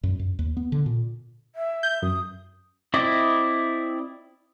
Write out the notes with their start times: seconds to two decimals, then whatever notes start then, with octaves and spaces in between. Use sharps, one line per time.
0.03 F#2
0.19 F#2
0.39 D#2
0.57 B3
0.72 D3
0.86 A#2
1.56 E5
1.83 G6
2.02 F#2 D#6
2.94 C4 E4 D5 D#5